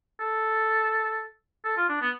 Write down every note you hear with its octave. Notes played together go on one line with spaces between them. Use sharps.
A4
A4
F4
D4
B3